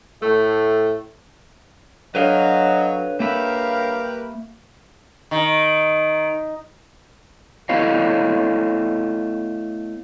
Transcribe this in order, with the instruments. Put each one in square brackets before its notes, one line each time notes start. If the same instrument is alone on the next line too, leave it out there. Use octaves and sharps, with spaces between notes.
[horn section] A2 A3
[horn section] F#3 [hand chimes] D4 A4 C#5 [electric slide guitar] B4 F5 [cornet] D#5
[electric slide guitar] A#3 E5 [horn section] G4 A#4 B4 [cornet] F5
[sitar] D#3
[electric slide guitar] A3 B3 E4 C#5 D#5 F5